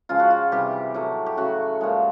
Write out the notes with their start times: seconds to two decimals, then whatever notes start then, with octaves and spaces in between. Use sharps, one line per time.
0.09 C#3 F3 G#3 F4
0.20 F#4
0.30 F4
0.52 C3 E3 G3 G4
0.94 A2 F#3 A3
1.26 G4
1.37 C#3 F#3 A3 F#4
1.81 A#2 F3 G#3